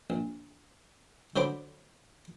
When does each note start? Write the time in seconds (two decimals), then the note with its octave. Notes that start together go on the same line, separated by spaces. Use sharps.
0.10 A#1
1.36 D3 F#3 C5 G5 B5 D6